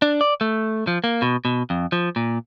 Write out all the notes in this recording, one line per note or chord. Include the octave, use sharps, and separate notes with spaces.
D4
D5
A3
F3
A#3
B2
B2
F2
F3
A#2